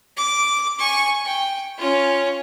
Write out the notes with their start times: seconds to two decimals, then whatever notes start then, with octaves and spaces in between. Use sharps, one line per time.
0.17 D6
0.79 G#5 C#6
1.25 G5
1.78 C#4 F4